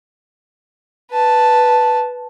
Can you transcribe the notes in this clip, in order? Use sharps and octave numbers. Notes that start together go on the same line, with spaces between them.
B4 A5